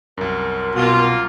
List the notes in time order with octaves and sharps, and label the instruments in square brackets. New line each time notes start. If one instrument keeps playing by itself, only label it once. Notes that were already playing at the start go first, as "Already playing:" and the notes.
[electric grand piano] C2 F#2 [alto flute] A#4
[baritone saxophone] B2 [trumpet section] A#3 F4